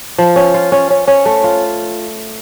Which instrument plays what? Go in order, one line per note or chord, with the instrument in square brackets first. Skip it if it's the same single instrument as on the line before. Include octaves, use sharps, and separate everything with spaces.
[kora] F3
C#4
F4
C#4
C#4
C#4
A3
F4